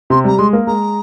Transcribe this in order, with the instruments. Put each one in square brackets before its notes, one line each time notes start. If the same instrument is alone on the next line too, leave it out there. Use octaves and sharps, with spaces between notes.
[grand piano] C3 [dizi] C6
[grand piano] G3 [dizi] A#5
[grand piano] G#3 [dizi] C6
[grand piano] A#3
[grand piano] G#3 [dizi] A#5